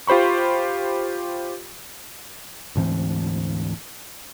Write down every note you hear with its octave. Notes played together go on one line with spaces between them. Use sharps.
F4 G4 C5 B5 C#6
D2 G#2 E3 C4